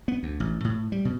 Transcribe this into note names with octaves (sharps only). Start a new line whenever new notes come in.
B3
D2
A1
A2
G3
B2